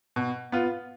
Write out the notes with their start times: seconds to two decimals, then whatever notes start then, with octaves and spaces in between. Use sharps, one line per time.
0.16 B2
0.52 B3 F4